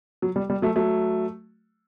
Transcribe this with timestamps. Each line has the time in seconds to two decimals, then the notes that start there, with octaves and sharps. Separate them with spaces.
0.22 F#3
0.36 G3
0.50 G3
0.62 F#3 A3
0.76 F#3 A3